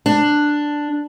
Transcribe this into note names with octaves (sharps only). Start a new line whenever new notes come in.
D4